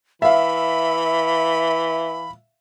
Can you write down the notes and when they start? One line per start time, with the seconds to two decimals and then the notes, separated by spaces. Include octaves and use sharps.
0.22 E3 E5 F5 B5